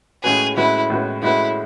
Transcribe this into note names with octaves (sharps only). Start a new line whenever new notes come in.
A2 G#3 C#4 F#4 G#4 B4
A2 G#3 C#4 E4 F#4 B4
A2 G#3 C#4 F#4 B4
A2 G#3 C#4 E4 F#4 B4